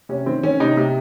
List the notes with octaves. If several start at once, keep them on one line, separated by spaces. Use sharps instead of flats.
C3 C#4
D#3 C4
D#3 C#4
C3 D#4
C3